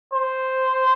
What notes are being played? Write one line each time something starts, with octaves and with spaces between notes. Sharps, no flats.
C5